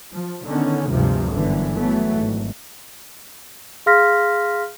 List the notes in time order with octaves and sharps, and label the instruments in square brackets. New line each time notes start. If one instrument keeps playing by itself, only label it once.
[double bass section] F3
D3 D#3 B3 C#4
D2 G2 C3 F3 G#3
G1 F#2 D3 E3
E3 F#3 A3 B3
G#1
[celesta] G#4 F5 C6 F6 A#6 B6